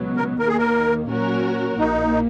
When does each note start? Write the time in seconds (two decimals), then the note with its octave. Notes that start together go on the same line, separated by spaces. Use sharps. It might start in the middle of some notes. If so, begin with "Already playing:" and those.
Already playing: C#2 B2 F#3 B3
0.17 A#4
0.39 D#2 D#3 A#3 A#4
0.48 G#4
0.58 A#4
1.09 A#2 F#3 C#4 F#4 A#4
1.78 A#1 A#2 A#3 D#4